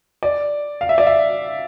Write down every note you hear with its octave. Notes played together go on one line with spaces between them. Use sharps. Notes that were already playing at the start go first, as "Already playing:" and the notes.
D5
F5
E5
D5
E5